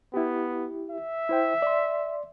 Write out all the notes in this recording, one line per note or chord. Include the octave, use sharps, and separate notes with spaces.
B3 E4 G4
E5
E4 C5 G5
D5 C6